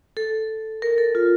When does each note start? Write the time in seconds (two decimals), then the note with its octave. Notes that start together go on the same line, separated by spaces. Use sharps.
0.17 A4
0.82 A#4
0.98 A4
1.15 F4